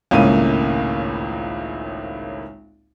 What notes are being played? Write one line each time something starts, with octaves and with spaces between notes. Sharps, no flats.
G#1 C#2 A2 C#3 A#3 D#7